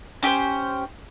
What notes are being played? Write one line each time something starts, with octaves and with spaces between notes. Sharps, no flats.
C#4 G4 A4 C5